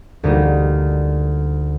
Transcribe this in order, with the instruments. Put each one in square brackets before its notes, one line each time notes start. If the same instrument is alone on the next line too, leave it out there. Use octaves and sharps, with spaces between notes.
[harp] D2 D3 G3 A#3 D#4